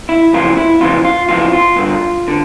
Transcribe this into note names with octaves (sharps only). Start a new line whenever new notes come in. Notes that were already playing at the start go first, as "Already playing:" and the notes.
E4
F2 C#3 E3 F4
E4
F2 C#3 E3 F4
F4
F2 C#3 E3 F4
F4
G2 D3
D3